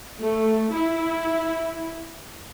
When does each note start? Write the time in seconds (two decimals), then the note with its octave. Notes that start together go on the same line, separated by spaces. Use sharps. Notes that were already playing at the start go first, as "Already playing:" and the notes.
0.21 A3
0.74 E4